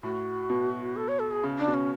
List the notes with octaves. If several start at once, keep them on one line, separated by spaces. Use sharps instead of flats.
A2 F#4
B2
A4
C#5
A4
G#4
C#3
D4
B2
C#4